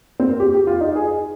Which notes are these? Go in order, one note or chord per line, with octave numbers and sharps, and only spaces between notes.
C4
A#3
G4
G4
F4
D#4
G#4